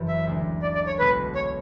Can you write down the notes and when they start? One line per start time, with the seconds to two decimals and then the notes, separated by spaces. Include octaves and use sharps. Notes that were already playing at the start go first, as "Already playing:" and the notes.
Already playing: F#1 F#2 E3
0.08 E5
0.26 D2 D3 G#3
0.62 D5
0.75 D5
0.87 C#5
0.99 B1 B2 G#3 B3 B4
1.35 C#5